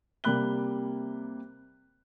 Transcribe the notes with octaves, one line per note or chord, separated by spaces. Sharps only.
C3 G3 A#3 B5 F#6 G7